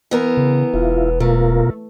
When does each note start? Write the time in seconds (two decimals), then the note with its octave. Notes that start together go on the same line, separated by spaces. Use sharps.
0.11 E3 B3 A#4
0.37 C#3
0.74 E1 E4 F4
1.20 B2 A3 F4 A#4